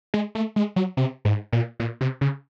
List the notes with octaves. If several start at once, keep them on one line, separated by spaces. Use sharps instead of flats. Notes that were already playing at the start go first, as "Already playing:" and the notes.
G#3
A3
G#3
F#3
C3
G#2
A#2
A#2
C3
C#3